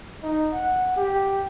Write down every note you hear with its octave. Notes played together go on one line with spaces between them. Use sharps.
D#4
F#5
G4